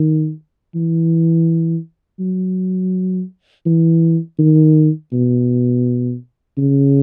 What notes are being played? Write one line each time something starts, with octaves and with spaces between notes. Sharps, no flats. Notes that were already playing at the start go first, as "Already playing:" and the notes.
Already playing: D#3
E3
F#3
E3
D#3
B2
C#3